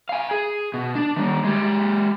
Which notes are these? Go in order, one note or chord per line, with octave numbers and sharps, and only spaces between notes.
F5 G#5
G#4
B2
D4
D#3 G3
G#3 G4